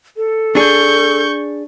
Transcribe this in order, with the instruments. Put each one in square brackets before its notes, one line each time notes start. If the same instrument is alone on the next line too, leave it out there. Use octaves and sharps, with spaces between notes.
[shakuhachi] A4
[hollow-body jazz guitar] D4 G#4 [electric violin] C#6 G6